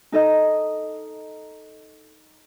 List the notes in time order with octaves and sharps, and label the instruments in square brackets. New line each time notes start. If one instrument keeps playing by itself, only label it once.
[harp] D#4 A4 D#5 A#5